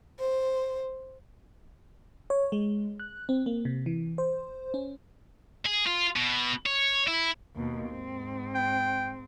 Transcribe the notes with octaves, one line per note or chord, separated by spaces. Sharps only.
C5
C#5
G#3
F#6
C4
A#3
C3
E3
C5
C#4
G#4
F4
B2
C#5
E4
D#2 B2
G#2 C4
G5